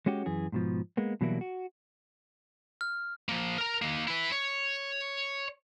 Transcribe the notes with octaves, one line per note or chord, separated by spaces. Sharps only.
G#3 C#4 F#4 G4
F#2 E3 G#4
G#2 B2 F3
G#3 A#3 B3
B2 E3 F#3 G3 A#3 E4
F#4
F6
F3 A#3
A#4 A#5
D#3 A#3
E4 B4
C#5